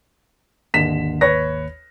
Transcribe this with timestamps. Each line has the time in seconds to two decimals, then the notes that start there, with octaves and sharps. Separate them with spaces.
0.74 G#1 D#2 D3 B6 E7
1.21 B4 C#5 A#6